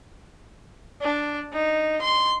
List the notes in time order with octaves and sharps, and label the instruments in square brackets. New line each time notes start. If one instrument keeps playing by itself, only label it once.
[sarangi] D4
D#4
C6